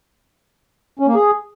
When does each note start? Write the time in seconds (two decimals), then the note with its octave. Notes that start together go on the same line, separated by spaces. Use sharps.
0.99 C#4
1.07 A#3
1.15 G#4